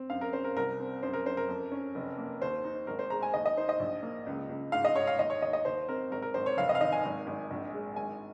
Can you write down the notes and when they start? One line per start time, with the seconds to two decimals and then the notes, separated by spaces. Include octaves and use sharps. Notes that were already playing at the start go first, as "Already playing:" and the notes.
Already playing: C4
0.10 F#2 F5
0.21 A#4
0.33 C#4 C5
0.44 A#4
0.56 C2 A#4
0.80 C4
1.03 F#2 C5
1.13 A#4
1.26 F#2 C5
1.37 A#4
1.48 F2
1.72 C#4
1.95 F1
2.18 A#3
2.41 D#2 C5
2.64 D#4
2.87 G#1 A#4
2.99 C5
3.10 G#3 A#5
3.23 G#5
3.34 D#2 D#5
3.46 D#5
3.57 D#4 C5
3.69 D#5
3.79 A#1
4.03 A#3
4.26 C#2
4.49 C#2
4.72 G#2 F5
4.85 D#5
4.96 G#2 C#5
5.07 F5
5.19 D#2 D#5
5.30 C#5
5.42 D#2 D#5
5.53 D#5
5.65 D#2 C5
5.89 C4 A#4
6.11 G#1 A#4
6.22 A#4
6.34 G#1 C5
6.46 C#5
6.57 F1 F5
6.69 D#5
6.75 F5
6.81 D#3 D#5
6.92 G#5
7.04 G#1
7.27 G#1
7.50 A#1
7.73 G#3
7.96 G#1 G#5